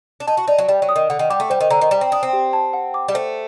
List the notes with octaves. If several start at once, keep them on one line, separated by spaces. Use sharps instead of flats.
D4
D#4 A5
F#4
D#4 D5
F#3
G3 D5
F#3
D#6
D#3
D3 F#5
D#3
G3 D6
A3
G3 C5
D#3
D3 A#5
D#3
G3 D5
C4
D4 D#6
C4
G4
A5
F#5
D6
G3
A3 C5